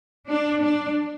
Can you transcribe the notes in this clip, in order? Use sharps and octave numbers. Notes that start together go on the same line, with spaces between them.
D4
D4